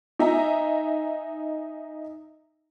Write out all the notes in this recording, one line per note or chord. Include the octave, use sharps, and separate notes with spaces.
D#4 D#5 E5 G#5 A#5